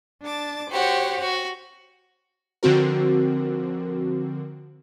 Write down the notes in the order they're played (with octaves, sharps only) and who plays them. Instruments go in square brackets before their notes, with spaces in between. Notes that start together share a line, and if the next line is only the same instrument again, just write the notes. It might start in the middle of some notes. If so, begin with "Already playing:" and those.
[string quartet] D4 A5 D6
[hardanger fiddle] F#4 G4 [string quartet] C5 C#5 F#5
[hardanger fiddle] F#4
[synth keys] D3 F3 C4 F#4 A#4